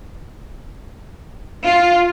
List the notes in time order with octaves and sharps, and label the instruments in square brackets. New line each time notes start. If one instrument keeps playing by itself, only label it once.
[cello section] F4